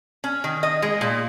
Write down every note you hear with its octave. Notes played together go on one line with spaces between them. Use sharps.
C#4
D#3
D#5
G#3
A#2